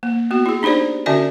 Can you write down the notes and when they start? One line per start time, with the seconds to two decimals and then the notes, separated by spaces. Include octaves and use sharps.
0.03 A#3
0.31 B3 F#4
0.46 E4 G#4
0.63 D4 D#4 G4 C5 D5
1.06 D3 C#4 F#4 D5 E5 G#5